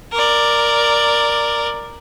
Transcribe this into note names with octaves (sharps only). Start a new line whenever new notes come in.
A#4 D5